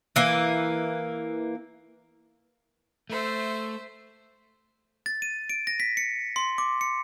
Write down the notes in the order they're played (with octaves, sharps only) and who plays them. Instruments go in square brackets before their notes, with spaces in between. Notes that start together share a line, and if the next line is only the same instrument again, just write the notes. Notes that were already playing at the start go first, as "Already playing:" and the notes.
[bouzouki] E3 A#3
[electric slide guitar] A3 [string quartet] C5 E5
[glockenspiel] A6
D#7
D7
A#6
B6
C#7
C6
D6
C#7